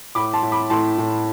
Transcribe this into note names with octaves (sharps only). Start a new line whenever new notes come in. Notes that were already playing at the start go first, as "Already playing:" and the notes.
A2 B5 D6
A5 C6
A2
B5 D6
A2 A5 C6
A2